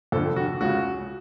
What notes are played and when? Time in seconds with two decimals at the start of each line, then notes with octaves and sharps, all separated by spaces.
0.12 F2 A4
0.16 D3
0.36 F#4
0.61 C#2 C#3 F#4